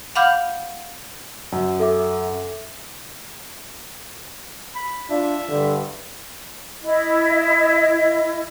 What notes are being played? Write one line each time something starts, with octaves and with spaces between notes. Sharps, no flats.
F5 F#5 B5 D6 F6 G6
F#2
A4 E5 D6
B5
D4 F4 E5
G2 D3
E4 D#5